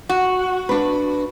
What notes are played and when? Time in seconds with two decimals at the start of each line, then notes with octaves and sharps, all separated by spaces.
0.09 F#4
0.69 D4 B4